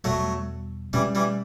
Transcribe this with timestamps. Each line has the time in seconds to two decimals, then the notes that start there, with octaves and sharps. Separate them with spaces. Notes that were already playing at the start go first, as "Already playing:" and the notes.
0.04 E2 B2 F#3 G3 A3
0.93 B2 E3 G3 A3 C#4
1.15 E3 G3